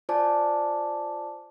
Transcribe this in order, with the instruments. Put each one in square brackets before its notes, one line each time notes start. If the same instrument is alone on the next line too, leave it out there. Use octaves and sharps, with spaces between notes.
[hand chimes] F4 C5 D5 G#5 A5 D6